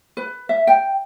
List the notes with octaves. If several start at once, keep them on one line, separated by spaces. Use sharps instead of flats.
B4
E5
G5